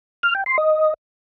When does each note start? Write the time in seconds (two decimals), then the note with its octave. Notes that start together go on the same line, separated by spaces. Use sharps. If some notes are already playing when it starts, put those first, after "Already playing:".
0.23 F6
0.35 G5
0.46 C6
0.58 D#5